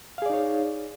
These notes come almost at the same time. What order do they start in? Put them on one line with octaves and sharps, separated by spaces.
F5 G#4 D5 D#4 C#5